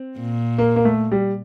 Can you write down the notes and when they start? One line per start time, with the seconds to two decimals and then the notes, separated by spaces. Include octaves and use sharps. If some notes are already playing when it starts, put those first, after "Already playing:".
Already playing: C4
0.19 A#2
0.58 A#3
0.76 A#3
0.85 A3
1.12 G3